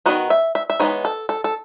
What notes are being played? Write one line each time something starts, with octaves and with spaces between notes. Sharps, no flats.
D#3 F#3 B3 D#4 F#4
E5
E5
E5
E3 G#3 B3 D#4 C#5
A4
A4
A4